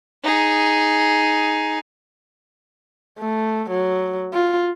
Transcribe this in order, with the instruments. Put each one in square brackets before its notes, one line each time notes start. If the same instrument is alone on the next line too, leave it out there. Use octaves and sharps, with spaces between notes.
[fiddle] D#4 G#4
[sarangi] A3
F#3
F4